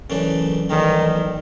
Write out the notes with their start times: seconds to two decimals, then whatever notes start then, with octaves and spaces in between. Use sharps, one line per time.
0.10 F#2 C#3 E3 A3 D4
0.69 B1 A2 D#3 E3 G3